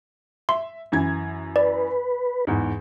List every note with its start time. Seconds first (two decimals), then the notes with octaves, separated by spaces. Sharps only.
0.49 E5 C6
0.92 F#2 E3 G#6
1.56 B4 D5
2.47 E2 G#2